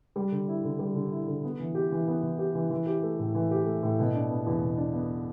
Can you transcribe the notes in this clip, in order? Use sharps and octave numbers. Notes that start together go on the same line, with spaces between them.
G3
D3
E4
D3
G3
D3
E4
D3
B3
E3
G4
E3
B3
E3
G4
E3
E3
G4
A3
A2
E3
G4
A3
A2
B2
D4
B3
E2
B2
D4
B3